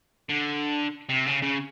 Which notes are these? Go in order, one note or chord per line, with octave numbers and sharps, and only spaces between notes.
D3
C3
C#3
C#3